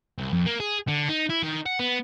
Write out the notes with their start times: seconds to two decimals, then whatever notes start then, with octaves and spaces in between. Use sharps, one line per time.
0.18 C2
0.33 F2
0.46 A#3
0.60 G#4
0.88 D3
1.08 D#4
1.29 E4
1.43 D#3
1.66 F#5
1.79 B3